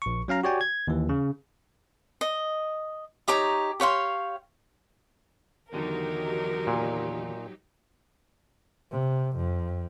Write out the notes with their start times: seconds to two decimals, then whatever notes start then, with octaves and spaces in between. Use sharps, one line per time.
0.02 A#1 C#6
0.28 F#3 C#4 F5 A#5
0.43 F#4 G4 C#5 D5 G5 G#5
0.61 G#6
0.87 D#2 E3
1.09 C#3
2.21 D#5
3.28 D#4 G4 C#5 A#5
3.80 G4 C#5 F5 C6
5.73 E2 D3 D#3 F#3 D#4 G4 A#4
6.67 A#2
8.91 C3
9.36 F2